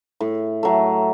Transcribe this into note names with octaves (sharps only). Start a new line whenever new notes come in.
A2
F#3 A3